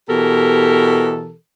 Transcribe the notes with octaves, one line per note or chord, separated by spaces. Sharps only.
B2 E3 G4 A4 A#4